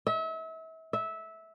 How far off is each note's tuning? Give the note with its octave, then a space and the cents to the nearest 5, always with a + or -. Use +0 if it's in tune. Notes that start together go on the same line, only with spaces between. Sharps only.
E5 -35
E5 -15